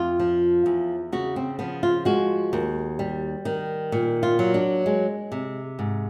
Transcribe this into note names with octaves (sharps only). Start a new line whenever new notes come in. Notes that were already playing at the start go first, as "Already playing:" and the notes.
Already playing: F2 F4
F3
E2
C#3 F#4
C4
F3 B3
F4
G#3 F#4
D#2
G3
D#3
A#2
F4
F#3
D4
G#3
C3
G#2